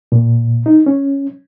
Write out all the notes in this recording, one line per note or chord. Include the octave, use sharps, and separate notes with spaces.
A#2
D#4
C#4